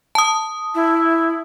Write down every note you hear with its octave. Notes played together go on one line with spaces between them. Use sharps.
A5 D#6
E4